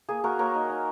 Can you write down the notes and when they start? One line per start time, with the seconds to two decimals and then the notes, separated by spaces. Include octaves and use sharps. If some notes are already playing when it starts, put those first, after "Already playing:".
0.09 A#3 G#4
0.24 A#3 F#4 A#4
0.39 A#3 A#4 C#5
0.55 D#4
0.70 D#4